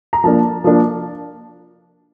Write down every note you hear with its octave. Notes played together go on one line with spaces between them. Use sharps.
A#5
F3 A#3 D4 A5
F3 A#3 D4